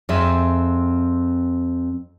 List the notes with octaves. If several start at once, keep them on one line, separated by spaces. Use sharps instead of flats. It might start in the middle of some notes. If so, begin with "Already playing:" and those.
F2 C4 G#4 E5